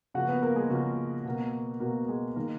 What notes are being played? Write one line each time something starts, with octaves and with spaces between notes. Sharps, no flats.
C#3 F3 A#3 F#4 F#5
B3 B4
A#3 A#4
G#3 G#4
C#3 F3 A#3 F#4
B2 A#3
B2 A#3 F#4
G#3 G#4
D#3 G#3 A#3 A#4